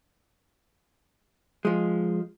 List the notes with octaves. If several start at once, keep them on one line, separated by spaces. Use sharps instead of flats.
F3 G#3